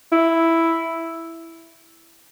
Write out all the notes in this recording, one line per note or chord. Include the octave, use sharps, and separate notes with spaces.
E4